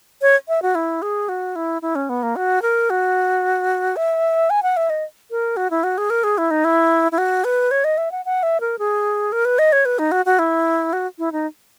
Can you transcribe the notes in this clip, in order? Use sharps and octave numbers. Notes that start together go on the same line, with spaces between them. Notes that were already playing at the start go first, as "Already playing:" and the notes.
C#5
E5
F#4
E4
G#4
F#4
E4
E4
C#4
B3
A#3
F#4
A#4
F#4
E5
G#5
F#5
E5
D#5
A#4
F#4
E4
F#4
G#4
A#4
G#4
E4
D#4
E4
E4
F#4
B4
C#5
D#5
E5
F#5
F#5
E5
A#4
G#4
A#4
B4
D#5
C#5
B4
D#4
F#4
F#4
E4
F#4
E4
D#4